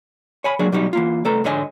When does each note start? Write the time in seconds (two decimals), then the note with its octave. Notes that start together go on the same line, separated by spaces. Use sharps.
0.44 C#5 G#5 B5
0.59 F#3 G#3 A#3 D4 G#4
0.72 B2 F#3 G3 D#4 G4
0.93 E3 A#3 F4
1.25 C2 A3 A4 B4 A#5
1.44 G#2 D3 C#5 D#5 F5 G#5